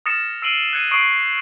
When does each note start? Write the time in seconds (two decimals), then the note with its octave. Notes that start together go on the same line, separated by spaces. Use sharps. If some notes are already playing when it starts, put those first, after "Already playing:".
0.06 D#6 F6 A6 A#6 C#7 E7
0.42 E6 C7 D7 D#7 F#7 G7
0.73 F#6 G#6 C#7 D#7
0.91 C#6 D#6 C7 D7 F#7
1.13 C#7